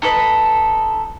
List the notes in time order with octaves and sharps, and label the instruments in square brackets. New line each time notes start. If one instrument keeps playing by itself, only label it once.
[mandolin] D#4 A4 B4